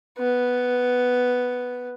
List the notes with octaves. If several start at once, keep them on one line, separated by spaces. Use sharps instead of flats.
B3